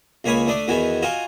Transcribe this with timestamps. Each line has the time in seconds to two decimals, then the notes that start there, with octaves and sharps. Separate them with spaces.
0.24 C#2 A#3 C#5 G#5 B5 D#6
0.47 A3 D4 D5 D#6
0.68 E2 D#3 B3 F#4 G#5
1.02 F4 F#4 D#5 G#5